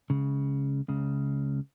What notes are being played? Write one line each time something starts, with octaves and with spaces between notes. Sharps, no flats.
C#2 C#3
C#2 C#3